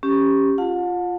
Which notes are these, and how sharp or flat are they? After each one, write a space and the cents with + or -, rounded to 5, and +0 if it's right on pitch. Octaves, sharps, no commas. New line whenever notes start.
C#4 +0 G4 +0
F4 +0 F#5 -45 A5 +20